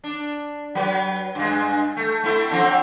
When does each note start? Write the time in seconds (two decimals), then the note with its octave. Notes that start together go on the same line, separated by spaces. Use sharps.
0.04 D4
0.75 F#3 B4
1.35 G2 G#3
1.97 A3
2.23 A3 C4 E4
2.51 D3 F3 C4